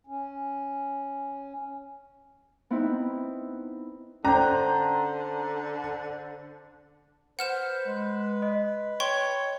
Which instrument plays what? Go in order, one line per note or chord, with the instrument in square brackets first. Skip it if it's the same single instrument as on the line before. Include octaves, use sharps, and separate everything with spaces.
[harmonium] C#4
[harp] B3 C4 D#4 E4
[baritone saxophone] D3 [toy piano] C#4 [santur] D4 C5 [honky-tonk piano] A#5
[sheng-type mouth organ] B4 [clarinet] C5 [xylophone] F#5 F6 E7
[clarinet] G#3
[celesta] D#5
[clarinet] C#5 [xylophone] G5 C6 C#6